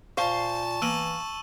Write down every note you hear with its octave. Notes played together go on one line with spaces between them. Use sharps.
A#2 C5 F5 A5 C#6
E3 A#3 E6 D#7 F#7